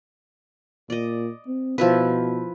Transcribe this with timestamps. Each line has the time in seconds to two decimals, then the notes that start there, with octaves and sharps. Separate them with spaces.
0.90 A#2 D5 D#5
1.47 C4
1.78 B2 F3 E4 B4